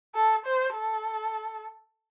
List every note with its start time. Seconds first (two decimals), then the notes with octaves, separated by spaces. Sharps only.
0.15 A4
0.45 C5
0.75 A4